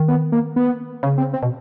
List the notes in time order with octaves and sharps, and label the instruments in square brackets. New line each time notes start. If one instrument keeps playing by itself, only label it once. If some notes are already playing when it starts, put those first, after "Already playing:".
Already playing: [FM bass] D#3
[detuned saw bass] B3
A#3
B3
[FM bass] C#3 [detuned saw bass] C#4
[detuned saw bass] C4
C4
[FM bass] B2